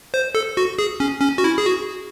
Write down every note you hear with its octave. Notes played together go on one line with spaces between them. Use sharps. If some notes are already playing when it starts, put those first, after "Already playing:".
C5
A4
F#4
G#4
C#4
C#4
F#4
E4
G#4
F#4